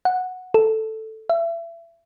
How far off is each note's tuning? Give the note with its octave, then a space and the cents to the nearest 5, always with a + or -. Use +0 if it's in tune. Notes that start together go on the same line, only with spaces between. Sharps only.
F#5 -10
A4 +0
E5 +30